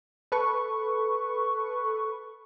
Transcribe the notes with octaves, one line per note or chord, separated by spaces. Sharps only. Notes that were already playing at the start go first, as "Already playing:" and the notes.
A4 B4 C#6